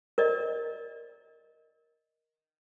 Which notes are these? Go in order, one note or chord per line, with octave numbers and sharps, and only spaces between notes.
A#4 D5 D#5